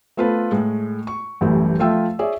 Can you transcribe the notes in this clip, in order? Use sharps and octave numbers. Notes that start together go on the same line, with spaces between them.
A3 B3 F4 A4 B4 C5
A2 G#3
C#6
A1 F#2 E3 G3 A3
F3 A3 F4 E5 G5 E6
G#4 C#5 D5 E5 G#5